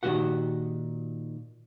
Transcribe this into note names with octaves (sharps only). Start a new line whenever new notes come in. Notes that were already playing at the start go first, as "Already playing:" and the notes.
A#2 D#3 G3 F#4 G4 F#5